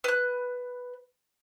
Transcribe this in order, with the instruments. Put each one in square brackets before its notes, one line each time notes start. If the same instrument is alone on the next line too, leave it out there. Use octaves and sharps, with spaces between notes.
[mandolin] B4 F#6